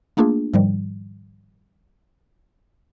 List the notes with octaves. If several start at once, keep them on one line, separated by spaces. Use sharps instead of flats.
A3 A#3 D4 F4 G#4
G#2 D#3 F3 G3